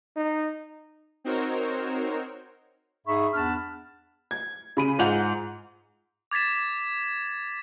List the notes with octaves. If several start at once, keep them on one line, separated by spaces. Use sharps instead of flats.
D#4
C4 D#4 F#4 A#4 C5 C#5
G#2 D#4 G#4 E5 B5 C#6
E2 B3 D4 A5 B5 F6
G#6
C#3 B5 D#7
G#2 F4 F#5 G6 F7 F#7
D6 G#6 A6 B6 E7